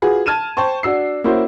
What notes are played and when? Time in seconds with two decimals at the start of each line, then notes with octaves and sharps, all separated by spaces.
0.02 F4 F#4 G#4 B4
0.26 A5 F6 G#6 D#7 E7
0.57 C5 G5 A5 C#6
0.83 D4 F#4 E6 C7
1.24 A#3 C#4 E4 F#4 C5